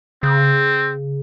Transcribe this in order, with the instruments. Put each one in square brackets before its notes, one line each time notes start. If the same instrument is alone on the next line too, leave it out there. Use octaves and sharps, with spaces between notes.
[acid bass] C#3 [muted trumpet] C4